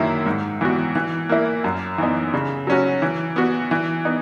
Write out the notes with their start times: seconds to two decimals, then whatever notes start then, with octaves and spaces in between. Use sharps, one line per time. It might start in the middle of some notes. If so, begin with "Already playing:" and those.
Already playing: F#2 D#3 F#3 A#3 E4
0.26 G#2
0.61 E3 B3 F#4
0.95 E3
1.29 A#3 E4
1.64 F#2
1.98 E3 B3 D#4
2.34 C#3
2.67 F#3 C#4 F#4
3.02 E3
3.36 B3 F#4
3.71 E3
4.05 B3 D#4